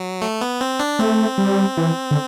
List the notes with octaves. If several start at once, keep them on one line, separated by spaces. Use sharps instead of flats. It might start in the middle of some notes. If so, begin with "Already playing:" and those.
Already playing: F#3
A3
B3
C4
D4
A3 C4
G3
E3
D3